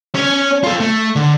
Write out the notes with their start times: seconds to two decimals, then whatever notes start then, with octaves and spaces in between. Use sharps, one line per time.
0.15 C#4 C#5
0.64 F4 A4
0.80 A3
1.16 D3